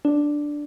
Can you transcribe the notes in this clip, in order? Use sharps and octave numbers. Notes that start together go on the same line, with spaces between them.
D4